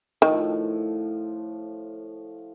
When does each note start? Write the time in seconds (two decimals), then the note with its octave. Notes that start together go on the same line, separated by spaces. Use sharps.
0.22 A2 D#3 F3